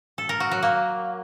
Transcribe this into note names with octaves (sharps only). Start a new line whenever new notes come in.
A4
A#4
F#4
F#3
A#3